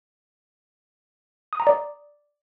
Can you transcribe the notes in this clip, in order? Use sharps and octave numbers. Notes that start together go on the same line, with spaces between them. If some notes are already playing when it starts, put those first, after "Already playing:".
D#6
A#5
D5